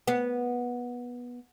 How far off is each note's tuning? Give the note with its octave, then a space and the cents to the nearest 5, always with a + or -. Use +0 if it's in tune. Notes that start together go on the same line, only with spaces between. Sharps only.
B3 -15